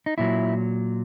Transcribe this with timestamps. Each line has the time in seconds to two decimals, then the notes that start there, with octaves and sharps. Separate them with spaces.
0.06 D#4
0.18 A#2 F#3 E4